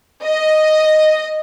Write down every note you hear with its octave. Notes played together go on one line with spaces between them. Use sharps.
D#5